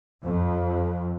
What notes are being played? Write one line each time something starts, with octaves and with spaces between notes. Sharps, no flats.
F2